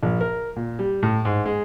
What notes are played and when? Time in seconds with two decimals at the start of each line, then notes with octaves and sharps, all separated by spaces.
0.03 A#1
0.21 A#4
0.56 A#2
0.79 G3
1.03 A2
1.25 G#2
1.45 G#3